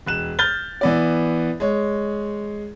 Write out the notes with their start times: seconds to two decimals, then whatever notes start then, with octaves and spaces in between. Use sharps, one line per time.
0.06 E1 F#6 E7
0.39 F6 G6 A6 G7
0.81 E3 B3 D5
1.60 G#3 C#5